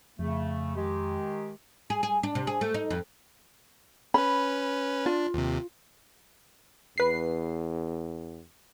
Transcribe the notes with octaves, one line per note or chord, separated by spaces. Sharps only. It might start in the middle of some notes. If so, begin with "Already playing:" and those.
F2 C#3 A3
D#3 G#3 G4
G#4
G#4
D4
C3
G#4
A3
D#4
F2
C#4 B4 B5
D4 F4
D#2 C3
E2 B4 C7